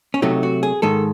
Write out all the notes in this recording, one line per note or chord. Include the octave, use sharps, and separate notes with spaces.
C#4
C3 F#3 A3 D#4
F#4
G#4
G#2 D#3 G#3 A4